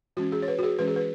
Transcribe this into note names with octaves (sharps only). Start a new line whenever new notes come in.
E3 G#3 C#4 F#4
G#4
C#5
B4
F#4
G#4
E3 G#3 C#4 B4
G#4
B4